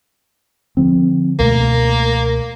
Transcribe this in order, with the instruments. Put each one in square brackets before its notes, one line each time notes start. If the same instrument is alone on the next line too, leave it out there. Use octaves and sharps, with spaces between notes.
[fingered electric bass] D3 F3 C4
[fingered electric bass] C#2 B2 A3 [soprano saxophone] A#3